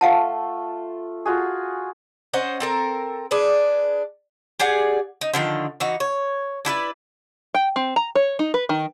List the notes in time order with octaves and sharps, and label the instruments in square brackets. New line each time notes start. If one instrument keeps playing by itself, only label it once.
[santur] A3 F4 [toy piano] F5 F#5 A5
[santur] F4 F#4 G#4
[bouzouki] C#4 C5 D#5 F#5
C4 A4 A#4
D4 G#4 B4
G4 G#4 D5 F#5
D#4
D3 D#3 F3 G5
E3 D#4 F#4
C#5
D4 E4 B4 D5
[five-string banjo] G5
C4
A#5
C#5
D#4
B4
D#3